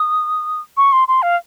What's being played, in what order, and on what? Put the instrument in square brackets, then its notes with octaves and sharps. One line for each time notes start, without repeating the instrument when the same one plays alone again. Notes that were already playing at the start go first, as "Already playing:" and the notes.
Already playing: [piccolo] D#6
C#6
C6
C6
F5